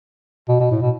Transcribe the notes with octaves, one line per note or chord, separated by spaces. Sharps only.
B2
B2
A2
B2